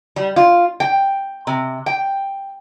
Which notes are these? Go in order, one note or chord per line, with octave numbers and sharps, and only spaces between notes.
G3
F4
G5
C3
G5